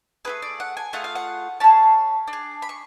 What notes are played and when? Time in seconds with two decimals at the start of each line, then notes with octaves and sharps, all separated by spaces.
0.25 A3 C#4 G#4 B4
0.42 D5
0.60 F#5
0.77 G#5
0.93 A3 F4 G#4 F#5
1.04 F5
1.15 F#5
1.60 C#4 G#4 A5
2.28 D4
2.33 G#4
2.62 B5
2.69 C#6